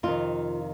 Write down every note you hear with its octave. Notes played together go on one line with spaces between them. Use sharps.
F2 C3 D#3 F4